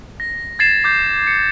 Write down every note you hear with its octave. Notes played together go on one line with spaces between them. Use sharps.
A#6
G#6 A6 C7 E7
D6 G6
C#7